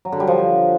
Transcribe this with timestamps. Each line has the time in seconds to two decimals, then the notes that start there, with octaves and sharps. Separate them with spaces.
0.05 F#3
0.12 D3
0.20 G3
0.27 F3